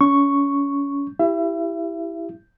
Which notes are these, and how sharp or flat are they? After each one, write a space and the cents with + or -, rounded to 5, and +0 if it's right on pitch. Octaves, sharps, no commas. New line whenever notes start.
C#4 +25 C#6 +0
E4 +0 G4 +0 E5 +35